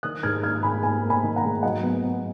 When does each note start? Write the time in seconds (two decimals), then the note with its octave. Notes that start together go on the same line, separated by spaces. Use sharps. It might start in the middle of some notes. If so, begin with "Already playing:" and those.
0.03 D#3 D#6 F#6
0.23 G#2 F6 G#6
0.43 D#3 F6 G#6
0.63 G#2 G#5 B5
0.83 G#2 G#5 B5
1.03 A#3
1.10 G#5 B5
1.23 D#3
1.36 F#5 A#5
1.44 G#2
1.63 F#3 D#5 F#5
1.83 B3
2.03 B3